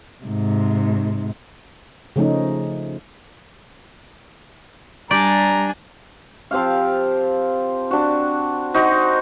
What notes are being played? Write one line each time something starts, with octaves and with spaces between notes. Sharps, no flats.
G#2 C3
C#3 F3 A3 C#4 D#4
G3 D4 G4 D5 G#5 A#5
F3 C4 G4 F5
D4 F#4
D#4 F#4 C5